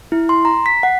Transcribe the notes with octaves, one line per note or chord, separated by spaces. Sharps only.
E4
C6
A#5
B6
F#5